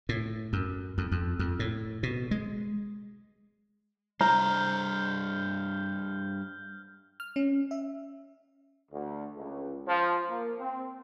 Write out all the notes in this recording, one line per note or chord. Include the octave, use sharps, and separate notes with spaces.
A2
F#2
F2
F2
F2
A2
B2
G#3
G3 D4 C5 A#5 F6 G6
F6
C#4
E5
D2
C#2
F3
A#3
C4